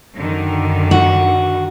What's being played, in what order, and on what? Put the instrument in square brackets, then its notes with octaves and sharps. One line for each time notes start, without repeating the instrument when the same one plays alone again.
[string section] F#2 D3 D#3
[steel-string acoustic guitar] F#4